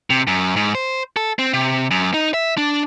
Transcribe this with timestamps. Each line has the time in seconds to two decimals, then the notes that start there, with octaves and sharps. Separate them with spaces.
0.10 C3
0.27 F#2
0.56 G#2
0.75 C5
1.16 A4
1.39 C4
1.54 C3
1.91 F#2
2.14 D#4
2.34 E5
2.58 D4